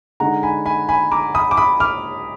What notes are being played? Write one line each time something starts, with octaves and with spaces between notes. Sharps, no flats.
D3 G#3 D#4 F#5 A#5
G#5 B5
G#5 B5
G#5 B5
A#5 D6
B5 D#6
D6
B5 D#6
D6 F6